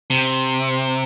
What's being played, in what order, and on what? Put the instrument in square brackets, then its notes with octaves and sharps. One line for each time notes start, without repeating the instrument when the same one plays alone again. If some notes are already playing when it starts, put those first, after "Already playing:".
[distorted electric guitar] C3